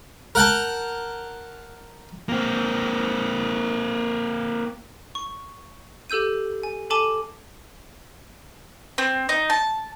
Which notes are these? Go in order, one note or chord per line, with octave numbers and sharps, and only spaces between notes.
A#4 F#5 G5 A5
A#3 C4
C#6
G4 A4 E6 G6 D#7
G#5
A4 G#5 A5 D6 D#7 G7
C4
D#4
A5